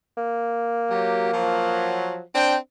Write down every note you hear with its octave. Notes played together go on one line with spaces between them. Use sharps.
A#3
F#3 G4
F3 F#3
C4 D4 G5